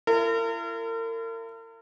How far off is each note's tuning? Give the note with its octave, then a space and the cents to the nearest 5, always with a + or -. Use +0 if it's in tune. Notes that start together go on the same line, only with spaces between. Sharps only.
E4 +45 A#4 -40